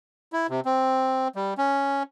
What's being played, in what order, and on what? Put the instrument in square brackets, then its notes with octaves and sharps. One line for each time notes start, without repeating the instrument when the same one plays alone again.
[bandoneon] E4
C3
C4
G3
C#4